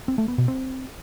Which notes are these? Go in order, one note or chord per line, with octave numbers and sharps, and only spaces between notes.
C4
A3
B3
B2
C4